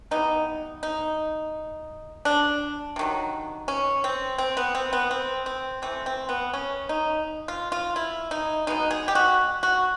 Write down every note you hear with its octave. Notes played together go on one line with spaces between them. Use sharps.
E3 G3 B3 D#4
D#4
D4
C3 D#3 F#3
C#4
C4
C4
B3
C4
B3
C4
C4
E3 A3 C4
C4
B3
C#4
D#4
F4
F4
E4
D#4
B2 G#3 B3 D#4
G#4
G4
F#4
F#4